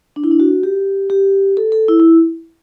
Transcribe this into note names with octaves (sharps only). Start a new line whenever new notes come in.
D4
E4
D4
F#4
G4
G4
A4
A4
E4
E4